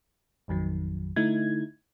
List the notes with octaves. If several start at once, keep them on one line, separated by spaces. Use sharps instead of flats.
A1 F2 D#3 F#3
D3 A3 D#4 E4 G#6